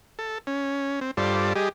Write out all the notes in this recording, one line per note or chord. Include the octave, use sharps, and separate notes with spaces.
A4
C#4
C4
G2 G3 F4 A4 C5 D5
G3 G4 G#4 D#5